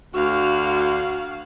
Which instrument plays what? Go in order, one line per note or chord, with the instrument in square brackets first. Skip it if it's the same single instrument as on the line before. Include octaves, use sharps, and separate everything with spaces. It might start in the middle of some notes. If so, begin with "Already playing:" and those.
[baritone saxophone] D2 [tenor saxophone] F#4 [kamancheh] F5 F6